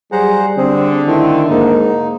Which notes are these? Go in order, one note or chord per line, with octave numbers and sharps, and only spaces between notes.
F#3 G3 G#4 C5 F#5 A#5
D3 C4 G#4
D#3 A3 C4 E4
G#2 A#3 D#4